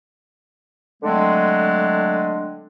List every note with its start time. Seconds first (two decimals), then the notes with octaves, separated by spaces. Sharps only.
1.03 D3 F#3 G#3 A3 C4 D4